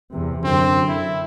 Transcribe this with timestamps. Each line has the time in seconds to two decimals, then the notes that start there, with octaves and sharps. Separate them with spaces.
0.11 E2 C3
0.44 F#2 D3 C4
0.88 E4